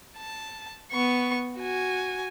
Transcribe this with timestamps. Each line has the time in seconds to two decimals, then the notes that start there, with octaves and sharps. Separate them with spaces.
0.18 A5
0.92 B3 C#6
1.58 F#4 G#5